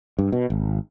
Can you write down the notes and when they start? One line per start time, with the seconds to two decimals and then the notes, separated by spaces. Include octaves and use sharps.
0.19 G2
0.32 B2
0.50 G#1